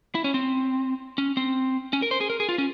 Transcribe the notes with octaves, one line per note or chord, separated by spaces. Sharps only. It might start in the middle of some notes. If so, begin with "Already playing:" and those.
E4
C#4
C4
C#4
C4
C#4
A#4
C5
G#4
A#4
G#4
F4
C#4